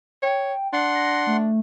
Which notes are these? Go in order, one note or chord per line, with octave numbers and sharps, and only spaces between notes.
C#5 G5
D4 F#5 C6
A#6
A3